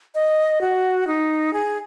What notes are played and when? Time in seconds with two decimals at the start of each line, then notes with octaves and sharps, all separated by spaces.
0.15 D#5
0.61 F#4
1.07 D#4
1.53 G#4